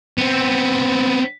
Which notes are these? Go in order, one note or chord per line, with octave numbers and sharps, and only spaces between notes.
B3 C4